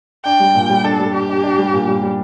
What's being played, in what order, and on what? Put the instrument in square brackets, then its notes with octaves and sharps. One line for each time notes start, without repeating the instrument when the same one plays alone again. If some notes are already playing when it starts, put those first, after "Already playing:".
[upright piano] D4 [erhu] G5
[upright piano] G3
A#2
G3
[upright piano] D4 [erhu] A4
[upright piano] G3
[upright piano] D4 [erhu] G4
[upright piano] D4
D4
G3
A#2
G3
G3